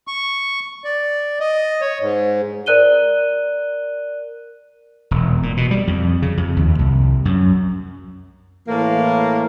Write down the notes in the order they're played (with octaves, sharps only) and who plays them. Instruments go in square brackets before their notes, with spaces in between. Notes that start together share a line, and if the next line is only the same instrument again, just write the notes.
[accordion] C#6
D5
D#5
C#5
G#2
[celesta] A#4 D5 F#6 D#7 G7
[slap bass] E1
A#2
B2
G3
F2
C#3
F2
D#2
C2
F#2
[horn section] A2 E3 A#3